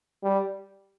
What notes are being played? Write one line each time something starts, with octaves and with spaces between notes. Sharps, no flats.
G3